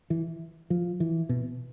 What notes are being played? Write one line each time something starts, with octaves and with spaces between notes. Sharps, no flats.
E3
F3
E3
B2